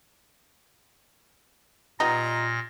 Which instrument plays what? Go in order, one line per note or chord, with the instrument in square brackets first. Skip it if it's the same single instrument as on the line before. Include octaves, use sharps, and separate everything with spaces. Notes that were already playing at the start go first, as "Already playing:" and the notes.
[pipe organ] A#2 A#6 [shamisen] G3 B3 D#4 [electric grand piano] F4 D#5 [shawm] A#5